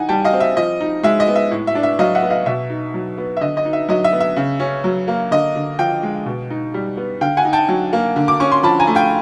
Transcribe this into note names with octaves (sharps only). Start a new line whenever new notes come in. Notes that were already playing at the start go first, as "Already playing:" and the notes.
Already playing: E3 D#4 F#5 G#5
G3 G5 A5
D#5 F5
C4
E5
F3 D#5
D#4
G#3 E5
D#5
B3
E5
A2
E5
D4
E5
F#3 D#5 F5
E5 F#5
B3
D#5 F5
B2 E5
D#4
F#3
B3
E5
D3 D#5
D#5
D#4
E5
F#3 D#5
E5
B3
E5
C#3
C#4
F#3
A#3
D3 D#5
D3
F3 F5 G5
G#3
B2
D#4
G3
B3
D3 F5 G5
F#5 G#5
D#4
G5 A5
F#3
A#3
D3
D6
C#4 C#6
C6
F3 A5 B5
G#5 A#5
A3
F5 G5